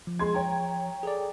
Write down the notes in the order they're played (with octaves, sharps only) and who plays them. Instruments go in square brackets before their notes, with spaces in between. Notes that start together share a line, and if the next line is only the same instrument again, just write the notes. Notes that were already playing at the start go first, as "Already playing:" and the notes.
[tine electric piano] F3
[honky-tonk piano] G#3 C6 G#6
C#5 G5 A#5
[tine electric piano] G#4 A4 D5